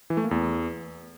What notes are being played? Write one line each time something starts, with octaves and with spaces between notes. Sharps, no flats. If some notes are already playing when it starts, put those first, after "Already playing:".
E3
A3
A#3
E2